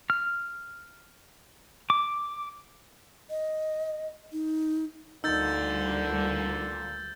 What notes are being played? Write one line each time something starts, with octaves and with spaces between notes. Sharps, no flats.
F6
D6
D#5
D#4
D2 A#2 D3 G3 D#4 E6 G6 A6